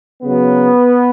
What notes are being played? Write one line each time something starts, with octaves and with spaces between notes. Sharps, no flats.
C#3 F#3 B3